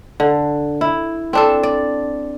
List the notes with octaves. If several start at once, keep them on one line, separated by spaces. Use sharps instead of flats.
D3
E4
C4 D4 A4
D5